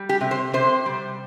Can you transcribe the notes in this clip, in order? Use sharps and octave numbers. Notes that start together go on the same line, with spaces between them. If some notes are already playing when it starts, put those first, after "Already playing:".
Already playing: G3
G4
C3
C5
C3 C5
G3